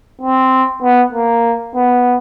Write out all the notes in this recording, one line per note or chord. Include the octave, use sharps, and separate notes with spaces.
C4
B3
A#3
B3